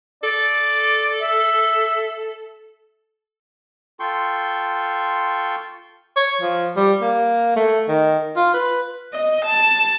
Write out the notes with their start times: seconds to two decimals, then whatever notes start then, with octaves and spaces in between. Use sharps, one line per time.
0.23 A4 D5
1.22 E5
4.00 F4 A4 G5 C6 C#6
6.17 C#5
6.41 F3
6.77 G3
7.02 A#3
7.56 A3
7.89 D#3
8.36 F4
8.54 B4
9.13 D#5
9.45 A5